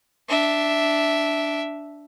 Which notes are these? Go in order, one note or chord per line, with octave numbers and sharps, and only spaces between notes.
D4 E5